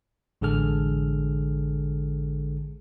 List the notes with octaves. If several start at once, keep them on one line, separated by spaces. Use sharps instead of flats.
A1 D3 G#3 G#4 A4 F6